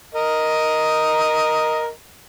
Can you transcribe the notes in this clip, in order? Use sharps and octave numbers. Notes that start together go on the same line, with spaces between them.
A#4 D#5